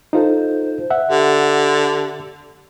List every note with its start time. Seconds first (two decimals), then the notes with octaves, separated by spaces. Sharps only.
0.13 D#4 F4 A4 C5
0.90 E5 F#5
1.09 D3 G4